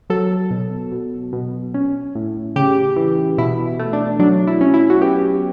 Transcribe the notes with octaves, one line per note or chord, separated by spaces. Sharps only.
F#3 A4
B2
B2
B2
C#4
A2
C#3 G4
E3
B2 E4
A3
D4
F#3 D4
E4
C#4
E4
F#4
B3 G4